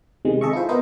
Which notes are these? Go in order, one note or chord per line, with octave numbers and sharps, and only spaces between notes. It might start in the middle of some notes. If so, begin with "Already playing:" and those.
C3 D#3 G#3
G#4 A4 D#5 E5 C#6
E4 F4 C5
B3 E4 A#4 C5 D#5